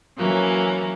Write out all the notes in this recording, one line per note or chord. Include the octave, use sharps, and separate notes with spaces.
E3 F#3 A#3 C#4